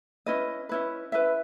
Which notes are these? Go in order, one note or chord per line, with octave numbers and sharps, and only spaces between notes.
C#4 E4 B4 D#5
C#4 E4 B4
C#4 E4 B4 E5